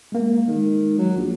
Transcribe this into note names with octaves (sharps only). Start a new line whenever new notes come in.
G#3 A#3
D#3 G#3
F#3
A#1